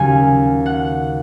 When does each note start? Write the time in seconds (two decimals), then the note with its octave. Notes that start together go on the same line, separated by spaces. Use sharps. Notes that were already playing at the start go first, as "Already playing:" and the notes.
Already playing: D#2 C#3 F#3 G#5
0.66 F#5